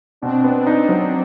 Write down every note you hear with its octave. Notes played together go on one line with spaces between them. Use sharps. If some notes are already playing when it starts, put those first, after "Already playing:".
B2 C4 D4
B3
D#4
F#3